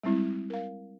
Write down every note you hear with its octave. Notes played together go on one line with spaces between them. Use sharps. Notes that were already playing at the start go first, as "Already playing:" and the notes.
G3 G#3 C4 E4
A#4 F5